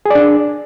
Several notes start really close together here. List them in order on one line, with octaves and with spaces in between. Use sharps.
G#4 D5 D4